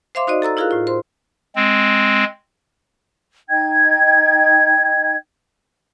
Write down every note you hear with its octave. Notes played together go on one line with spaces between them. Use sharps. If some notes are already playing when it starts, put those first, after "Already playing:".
C5 E5 F5 C6 D6
D#4 F#4 C5 D5 D#5
A4 A#5 E6 A6
E4 F4 G#4 A#4 F5 F#6
A2 F4
C5 C6
G#3 C4
D#4 D#5 G5 G#6